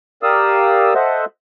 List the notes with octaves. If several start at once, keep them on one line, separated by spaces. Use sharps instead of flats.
G4 A#4 D5 F5 D#6 E6
A4 C5 D#5 E5 F#5